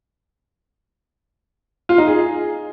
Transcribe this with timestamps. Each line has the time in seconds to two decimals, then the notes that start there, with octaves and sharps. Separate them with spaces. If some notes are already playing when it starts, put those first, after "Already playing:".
1.89 F4
1.98 D#4
2.07 G#4